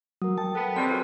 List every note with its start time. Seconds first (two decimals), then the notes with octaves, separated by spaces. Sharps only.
0.22 F#3 A#4 D#6
0.38 G5 A5
0.55 B3 A4
0.76 B2 D3 G3 C4 C6 B6
0.90 F#2 F4 G#4 B4